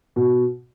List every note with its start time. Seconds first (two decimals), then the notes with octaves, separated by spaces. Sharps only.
0.16 B2